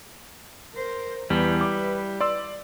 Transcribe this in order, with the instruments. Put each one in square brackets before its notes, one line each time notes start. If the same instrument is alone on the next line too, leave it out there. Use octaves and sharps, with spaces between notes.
[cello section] A#4 C5
[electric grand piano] E2 [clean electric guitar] G3 [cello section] E4 B4
[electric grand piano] D6
D5 C6 E6